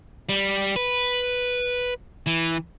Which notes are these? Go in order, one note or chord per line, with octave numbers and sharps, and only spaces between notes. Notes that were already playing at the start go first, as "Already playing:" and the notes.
G3
B4
E3